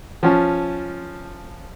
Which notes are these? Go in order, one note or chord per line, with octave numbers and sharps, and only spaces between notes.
F3 C#4 A5